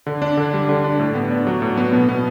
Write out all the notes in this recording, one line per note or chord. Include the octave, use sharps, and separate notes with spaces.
D3
D4
D3
G3
D3
D4
A2
B3
D4
F#3
A2
B3
B2
B3